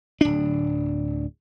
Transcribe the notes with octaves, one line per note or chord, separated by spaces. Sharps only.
D1 D4